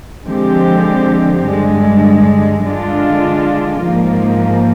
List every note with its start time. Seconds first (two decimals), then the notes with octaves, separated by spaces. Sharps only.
0.24 D3 F3 G#3 C4 G4
1.44 G2 D3 G#3
2.64 D3 G#3 D4 F4
3.83 G#2 F3 A#3